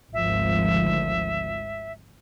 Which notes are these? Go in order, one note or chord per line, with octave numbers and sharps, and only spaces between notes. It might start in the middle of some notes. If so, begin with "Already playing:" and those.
G#1 D2 F3 E5